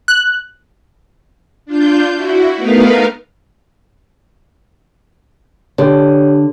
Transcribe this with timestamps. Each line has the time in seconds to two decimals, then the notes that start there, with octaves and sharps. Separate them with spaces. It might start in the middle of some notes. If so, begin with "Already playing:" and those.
0.08 F#6
1.66 D4 F4 G6
2.14 E4 F#4
2.56 A3 B3 D#4 A#4 B4 F5
5.78 D3 G4 C#5